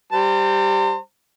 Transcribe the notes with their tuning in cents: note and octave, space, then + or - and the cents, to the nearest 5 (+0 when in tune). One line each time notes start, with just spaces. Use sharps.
G3 +0 C5 +0 A#5 -45